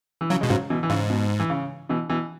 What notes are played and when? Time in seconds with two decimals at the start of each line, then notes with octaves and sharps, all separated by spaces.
0.21 E3
0.30 C#3 F#3
0.41 B2 G#3
0.50 G#2 C#3 F#3
0.70 B2 E3
0.83 E3
0.90 G#2 C#3
1.10 B2
1.39 E3
1.50 C#3
1.89 B2 E3
2.10 B2 E3